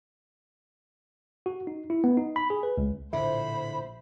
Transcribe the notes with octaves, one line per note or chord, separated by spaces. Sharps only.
F#4
D#4
E4
B3
D#4
B5
G#4
B4
C#2
A#1 A2 D3 C5 E5 B5